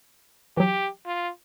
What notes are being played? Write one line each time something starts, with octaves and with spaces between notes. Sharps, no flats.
E3 F#3 G4
F4